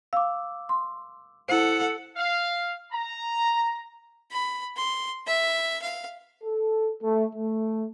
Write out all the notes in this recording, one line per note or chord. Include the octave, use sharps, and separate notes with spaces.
F5 D6 E6
C6
E4 A4 C5 F#5
F5
A#5
B5
C6
E5
F5
A4
A3
A3